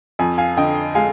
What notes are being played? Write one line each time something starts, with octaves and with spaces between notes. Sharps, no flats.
F2 G#5
F5 G#5
D3 D#5 G5
G#3 F5 G#5